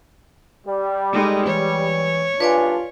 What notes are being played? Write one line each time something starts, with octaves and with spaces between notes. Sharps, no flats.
G3
G#3 D#4 A4
E3 C#5
B1 G2 D4 F4 B4 D5 G#5